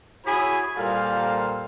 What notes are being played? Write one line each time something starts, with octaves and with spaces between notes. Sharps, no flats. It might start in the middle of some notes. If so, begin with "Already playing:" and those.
E4 F#4 G#4 C#5 G#5 B5
A#2 G3 A#3 A4 C5 F5